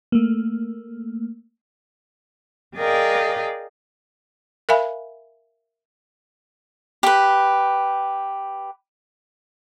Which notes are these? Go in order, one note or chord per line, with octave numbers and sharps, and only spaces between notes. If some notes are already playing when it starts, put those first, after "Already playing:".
A3 A#3
G#4 A#4 D5 D#5 F5 G5
A#4 E5 F5 G#5 B5
G4 B4